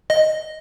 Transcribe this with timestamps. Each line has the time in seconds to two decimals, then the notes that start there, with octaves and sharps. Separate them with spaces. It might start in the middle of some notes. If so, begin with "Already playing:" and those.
0.10 D#5